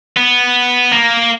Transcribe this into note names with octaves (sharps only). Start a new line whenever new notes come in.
B3
A#3